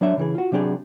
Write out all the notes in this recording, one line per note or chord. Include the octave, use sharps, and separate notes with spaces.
F#3 D4 C#5 E5
C#3 E3 G#4
F4 F#4
C3 F#3 D4 G4 G#4